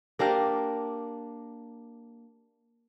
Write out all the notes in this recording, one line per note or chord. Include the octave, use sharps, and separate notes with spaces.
A#3 D4 G4 A#4